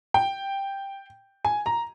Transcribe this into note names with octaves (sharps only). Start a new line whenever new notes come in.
G5
G#5
A#5